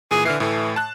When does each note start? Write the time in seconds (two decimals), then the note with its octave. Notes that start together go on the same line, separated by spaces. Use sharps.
0.11 A#2 E3 G#4
0.25 D3 E3 F6 C7
0.40 A2 E3 A3
0.76 A5 F#6